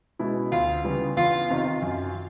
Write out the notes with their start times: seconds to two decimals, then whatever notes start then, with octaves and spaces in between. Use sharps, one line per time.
0.19 B2 G#3 C#4 E4
0.52 D2 F4
0.84 C#3 E3 G3 B3
1.16 E2 F4
1.50 C3 D#3
1.82 F#2